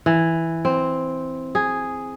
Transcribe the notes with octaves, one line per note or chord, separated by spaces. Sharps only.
E3
C4
G#4